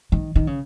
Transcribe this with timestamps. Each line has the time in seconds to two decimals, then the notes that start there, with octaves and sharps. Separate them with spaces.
0.12 D#3
0.36 D#3
0.47 C#3